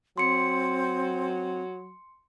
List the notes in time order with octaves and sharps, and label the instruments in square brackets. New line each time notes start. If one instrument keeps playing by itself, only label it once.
[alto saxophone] F#3 [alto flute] C4 [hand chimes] C6 C#7